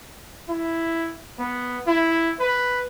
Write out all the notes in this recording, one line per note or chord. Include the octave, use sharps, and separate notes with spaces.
E4
B3
E4
B4